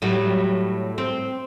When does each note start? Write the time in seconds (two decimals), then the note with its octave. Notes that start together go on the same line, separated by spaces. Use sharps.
0.02 A2 F#3 G3
0.98 C4